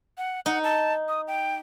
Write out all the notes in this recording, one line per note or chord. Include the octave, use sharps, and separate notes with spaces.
F#5
D#4 F#5
A5
D#6
G5